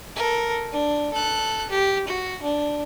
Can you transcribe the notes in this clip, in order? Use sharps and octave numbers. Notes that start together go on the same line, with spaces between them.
A4 A#4
D4
A4 F#6
G4
F#4
D4